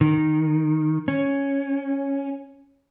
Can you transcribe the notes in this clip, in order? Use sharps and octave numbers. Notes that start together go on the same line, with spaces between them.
D#3
C#4